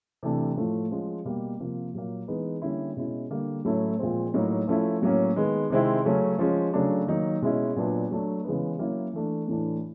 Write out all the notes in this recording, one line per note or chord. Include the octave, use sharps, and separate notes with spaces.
C3 E3 A3 D4
A2 F3 A3
F3 G#3 C#4
B2 G3 A#3
C3 F3 A#3
A#2 F#3 A#3
E3 G#3 B3 D#4
D3 G3 A#3 C#4 E4
B2 G#3 C#4 E4
D3 G3 A#3
A2 F#3 A3 C#4 E4
A#2 F3 G#3 C4
A2 F#3 A#3 D#4
F3 A3 C#4 E4
A2 F#3 A#3 C#4
D#3 G#3 B3
C3 D#3 G#3 C4 E4
C#3 F#3 A3 C#4
F3 G#3 C#4
C#3 F#3 A3 D4
D#3 F#3 A#3 D#4
B2 G#3 C#4 E4
A#2 F#3 B3 D4
F#3 A3 D4
C#3 E3 G#3 B3
F#3 A#3 C#4 E4
E3 A3 D4
A2 E3 A3 D4